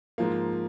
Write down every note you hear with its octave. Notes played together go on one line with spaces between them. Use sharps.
G#2 F3 A#3